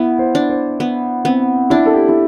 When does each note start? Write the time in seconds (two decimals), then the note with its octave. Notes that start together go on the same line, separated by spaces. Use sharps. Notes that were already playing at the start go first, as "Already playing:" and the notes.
Already playing: B3 E4
0.19 C5
0.35 D4
0.49 C5
0.80 B3
1.25 B3 C4
1.70 D4 E4
1.86 A4
1.93 G4
2.09 E4